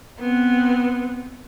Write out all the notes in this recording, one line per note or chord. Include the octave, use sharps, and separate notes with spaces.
B3 C4